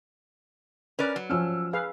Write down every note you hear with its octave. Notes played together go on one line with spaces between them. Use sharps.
C#4 A#4 B4 D5
F#3
F3 C#4 E6 F6
G#4 B4 F5